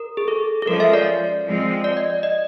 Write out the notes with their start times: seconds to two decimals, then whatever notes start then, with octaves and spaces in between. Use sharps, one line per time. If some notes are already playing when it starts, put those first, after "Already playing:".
Already playing: A#4
0.17 G#4
0.28 A4
0.62 A4
0.67 F3 G#3 C#4 A#4
0.80 E5
0.94 D5
1.46 F3 G#3 C4
1.84 D5
1.97 D#5
2.10 D5
2.23 D#5